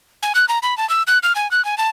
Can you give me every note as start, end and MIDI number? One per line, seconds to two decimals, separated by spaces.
0.22 0.33 80
0.35 0.45 90
0.48 0.59 82
0.62 0.77 83
0.77 0.88 81
0.89 1.02 88
1.07 1.18 90
1.23 1.33 89
1.35 1.49 80
1.51 1.63 90
1.65 1.77 80
1.78 1.89 81